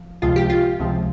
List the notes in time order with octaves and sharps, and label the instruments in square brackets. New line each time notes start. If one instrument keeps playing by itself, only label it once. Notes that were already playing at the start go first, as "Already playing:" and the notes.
Already playing: [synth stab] F3
C#2 C3 F3 G#3 F4
G4
F4
C#2 C3 F3 G#3